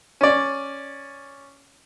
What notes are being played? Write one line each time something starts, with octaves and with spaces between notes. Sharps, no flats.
C#4 D5